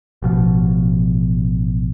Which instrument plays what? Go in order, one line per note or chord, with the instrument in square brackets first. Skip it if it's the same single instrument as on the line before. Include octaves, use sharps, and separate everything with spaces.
[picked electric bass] A1 B2 F3